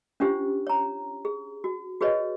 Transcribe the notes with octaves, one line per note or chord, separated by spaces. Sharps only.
C#4 D4 F4 G4 C5
C#5 A#5
G#4
F#4
F#4 G#4 B4 C#5 D#5